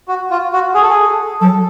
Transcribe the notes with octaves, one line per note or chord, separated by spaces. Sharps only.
F#4
F4
F#4
G#4
A4
G#4
F#3 A4